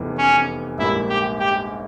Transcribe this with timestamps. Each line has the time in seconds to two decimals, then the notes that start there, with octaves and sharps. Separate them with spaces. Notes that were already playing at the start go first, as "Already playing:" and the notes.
Already playing: F1 E2 E3
0.18 C#4
0.78 A#1 G#2 G3 A#3 E4
1.09 G4
1.39 G4